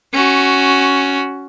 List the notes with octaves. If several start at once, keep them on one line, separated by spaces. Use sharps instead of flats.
C#4 F#4